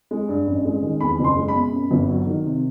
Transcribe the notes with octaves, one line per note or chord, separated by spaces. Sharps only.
G#3
G2
A1
G#3
D#3
E2 B5
F#1
C6
G#3
B5
B2
F#2
G1
F#3
D#3
C3